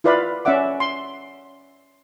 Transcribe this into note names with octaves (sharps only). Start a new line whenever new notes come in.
E4 F4 B4 D5 F5 B5
C#4 D5 E5 F#5 D6
C6